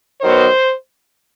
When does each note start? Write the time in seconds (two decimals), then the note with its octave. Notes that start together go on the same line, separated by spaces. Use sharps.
0.21 D#3 F#3 B3 C5